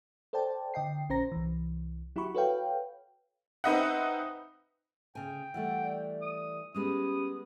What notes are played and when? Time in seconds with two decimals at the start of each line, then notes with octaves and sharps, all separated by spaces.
0.33 A4 C5 D5 G5 A5
0.74 D3 D#5 G5 C7
1.09 A#1 C#4 C5 A#5 A#6
1.32 C2 E3
2.16 F#3 E4 F#4 G4 B5 C#6
2.35 F#4 A4 B4 C#5 F5 G5
3.64 C4 D#4 B4 D#5 E5 F#5
5.15 D2 C#3 G5 G#5
5.54 E3 G3 A3 F#5
5.84 D5
6.22 D#6
6.74 G3 G#3 B3 C#4 G4 B5 D#6